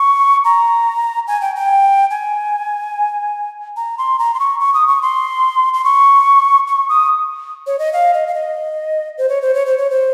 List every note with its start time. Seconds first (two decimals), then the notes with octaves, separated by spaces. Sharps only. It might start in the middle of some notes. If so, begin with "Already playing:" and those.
Already playing: C#6
0.44 A#5
1.28 G#5
1.41 G5
1.55 G5
2.11 G#5
3.77 A#5
3.98 C6
4.19 A#5
4.34 C6
4.39 C#6
4.60 C#6
4.74 D#6
4.88 C#6
5.02 C6
5.74 C6
5.84 C#6
6.68 C#6
6.89 D#6
7.67 C#5
7.79 D#5
7.93 F5
8.14 D#5
8.27 F5
8.35 D#5
9.18 C5
9.29 C#5
9.42 C5
9.54 C#5
9.66 C5
9.78 C#5
9.90 C5